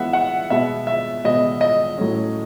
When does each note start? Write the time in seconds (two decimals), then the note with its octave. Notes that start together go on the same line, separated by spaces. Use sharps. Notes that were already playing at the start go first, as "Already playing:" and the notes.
Already playing: E3 G#3 B3 E5 F#5
0.13 F#5
0.50 B2 G#3 B3 E5
0.87 E5
1.24 B2 G#3 B3 D#5
1.61 D#5
1.98 A2 F#3 A3 C#4